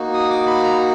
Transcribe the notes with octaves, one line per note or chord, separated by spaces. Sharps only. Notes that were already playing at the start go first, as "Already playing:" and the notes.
Already playing: A#3 D#4 F#4
D#6
D6
B5
A#5